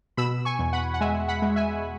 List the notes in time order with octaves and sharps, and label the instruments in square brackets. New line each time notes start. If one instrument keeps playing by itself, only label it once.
[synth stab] B2 B5 E6
G#5 C#6
E2
F#5 B5
F#5
G#3 E5 G#5
F#5 B5
G#3
E5 G#5